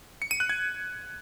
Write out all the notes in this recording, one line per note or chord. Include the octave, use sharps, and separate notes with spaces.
C#7
D#7
F#6
G#6